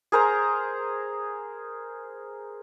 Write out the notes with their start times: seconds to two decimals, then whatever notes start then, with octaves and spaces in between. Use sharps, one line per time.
0.12 G#4 A#4 C5 A#5